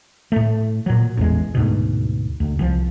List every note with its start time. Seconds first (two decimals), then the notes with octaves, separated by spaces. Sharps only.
0.32 A2 A3
0.86 A#2 F#3
1.17 A1 E2 G#3
1.55 D2 G#2 B2
2.40 D2
2.59 C2 F3